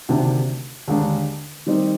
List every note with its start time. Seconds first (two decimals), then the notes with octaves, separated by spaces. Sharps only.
0.09 D2 C3 D#3 A#3 D4
0.88 D#2 D3 G#3 D4
1.66 D#3 G3 C4 D#4